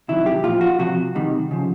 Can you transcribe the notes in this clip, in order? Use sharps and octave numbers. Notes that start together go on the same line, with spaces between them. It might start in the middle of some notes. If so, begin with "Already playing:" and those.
C3 D#3 F#3 E4
G4
A#2 F3 F4
F#4
C3 F3 F#4
C3 D#3 G3
C#3 F3